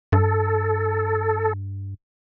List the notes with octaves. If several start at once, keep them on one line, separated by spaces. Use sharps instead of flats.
G2 A4